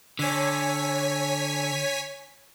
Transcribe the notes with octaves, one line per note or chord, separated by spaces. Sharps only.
D3 C#5 G#5 B6